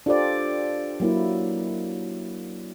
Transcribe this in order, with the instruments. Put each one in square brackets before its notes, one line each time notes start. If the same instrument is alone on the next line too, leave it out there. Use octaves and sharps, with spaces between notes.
[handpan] D4 F4 G4 A4 C5 D5
F#3 A#3 E4